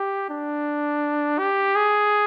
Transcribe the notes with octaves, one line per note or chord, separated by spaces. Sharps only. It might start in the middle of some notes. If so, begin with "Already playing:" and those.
Already playing: G4
D4
G4
G#4